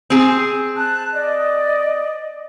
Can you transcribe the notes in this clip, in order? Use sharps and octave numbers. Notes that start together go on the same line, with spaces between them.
C4 G#4
A5 F#6
D5 D#5